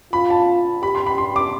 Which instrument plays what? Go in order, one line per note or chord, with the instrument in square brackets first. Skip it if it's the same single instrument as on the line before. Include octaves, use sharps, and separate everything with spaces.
[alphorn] F4 [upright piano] B5
[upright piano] A5
[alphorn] G4 [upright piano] B5
[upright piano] C6
B5
C6
D6